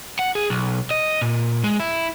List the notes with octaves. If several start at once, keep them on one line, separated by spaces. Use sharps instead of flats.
F#5
G#4
B1
D#5
A#2
G#3
E4